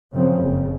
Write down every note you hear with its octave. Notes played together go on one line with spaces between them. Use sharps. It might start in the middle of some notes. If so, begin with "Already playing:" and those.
F#2 C#3 F3 C4
F#1 F2 C#3